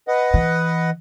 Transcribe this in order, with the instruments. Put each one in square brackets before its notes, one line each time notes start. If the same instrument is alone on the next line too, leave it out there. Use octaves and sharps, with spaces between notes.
[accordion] B4 D#5 F#5
[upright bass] E3